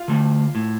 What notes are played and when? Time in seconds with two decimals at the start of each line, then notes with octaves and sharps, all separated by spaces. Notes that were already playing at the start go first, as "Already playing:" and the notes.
Already playing: F4 F5
0.08 D3 A3
0.55 A2